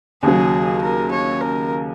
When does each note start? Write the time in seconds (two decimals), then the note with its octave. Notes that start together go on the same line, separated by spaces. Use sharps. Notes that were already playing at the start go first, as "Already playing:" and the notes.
0.23 D#2 C#3 F#3 G#4
0.82 A#4
1.12 C#5
1.41 A#4